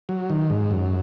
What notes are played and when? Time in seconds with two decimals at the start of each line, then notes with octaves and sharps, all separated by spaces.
0.09 F#3
0.30 D#3
0.50 G#2
0.71 F#2